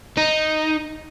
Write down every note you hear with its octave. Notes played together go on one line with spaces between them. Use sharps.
D#4